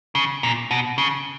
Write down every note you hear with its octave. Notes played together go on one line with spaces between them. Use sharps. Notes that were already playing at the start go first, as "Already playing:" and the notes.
C#3
A#2
B2
C#3